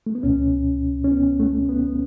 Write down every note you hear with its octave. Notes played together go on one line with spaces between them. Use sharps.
A3
B3
C#2 B2 C#4
C#4
B3
A3
B3